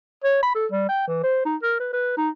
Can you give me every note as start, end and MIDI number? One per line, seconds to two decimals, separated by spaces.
0.24 0.41 73
0.43 0.52 83
0.55 0.66 69
0.72 0.85 55
0.89 1.04 79
1.08 1.20 52
1.23 1.45 72
1.45 1.56 63
1.63 1.77 70
1.80 1.90 71
1.93 2.14 71
2.18 2.30 63